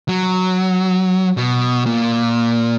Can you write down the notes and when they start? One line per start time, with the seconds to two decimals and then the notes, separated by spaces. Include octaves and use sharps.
0.08 F#3
1.37 B2
1.86 A#2